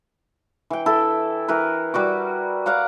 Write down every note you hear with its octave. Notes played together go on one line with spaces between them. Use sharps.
E3 G5
E4 A4
E3 A#4 B4
G3 F#4 D6
D5 F5 F#5 A#5